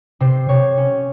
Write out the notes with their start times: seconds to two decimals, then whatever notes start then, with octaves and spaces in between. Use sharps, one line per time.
0.20 C3 C5
0.49 C3 C#5
0.77 C#4